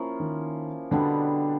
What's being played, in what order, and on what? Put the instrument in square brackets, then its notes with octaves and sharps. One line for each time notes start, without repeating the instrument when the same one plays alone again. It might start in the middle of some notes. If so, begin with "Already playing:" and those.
Already playing: [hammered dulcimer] F3 A#3 C#4 E4
[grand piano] D#3
[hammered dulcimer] B2 G3 B3 D4 [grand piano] D3